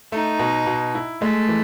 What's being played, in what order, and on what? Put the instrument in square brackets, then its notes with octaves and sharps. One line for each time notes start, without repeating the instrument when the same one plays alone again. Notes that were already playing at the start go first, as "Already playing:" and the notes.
[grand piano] A3 [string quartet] D#4
[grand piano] B2
B2
E4
[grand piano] G#3 [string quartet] A3
[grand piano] E3